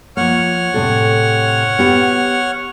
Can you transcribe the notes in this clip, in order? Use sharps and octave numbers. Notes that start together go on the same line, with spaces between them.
F3 A#3 C#5 F#5 F6
A2 C3 A4
B3 G4